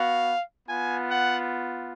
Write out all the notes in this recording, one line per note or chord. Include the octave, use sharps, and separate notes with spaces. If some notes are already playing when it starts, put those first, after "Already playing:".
Already playing: B3 F#4 F5
B3 F4 G#5
F#5